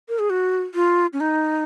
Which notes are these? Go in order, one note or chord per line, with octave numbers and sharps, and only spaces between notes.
A#4
G#4
F#4
F4
C#4
D#4